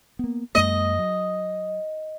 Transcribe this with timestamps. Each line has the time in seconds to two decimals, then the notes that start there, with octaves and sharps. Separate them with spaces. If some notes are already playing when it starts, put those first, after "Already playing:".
0.19 A#3 B3
0.55 F#2 G#3 A#3 D#5
0.99 F#3